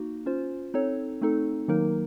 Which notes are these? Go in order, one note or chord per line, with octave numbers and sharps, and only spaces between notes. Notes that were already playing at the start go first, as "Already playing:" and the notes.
Already playing: A#3 D#4 F#4
C#4 F4 C5
C4 D#4 A4 C#5
A3 C4 D#4 A4
D#3 F#3 A#3 D#4 A#4